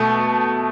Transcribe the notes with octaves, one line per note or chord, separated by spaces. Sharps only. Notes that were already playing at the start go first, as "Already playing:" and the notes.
Already playing: B2 A3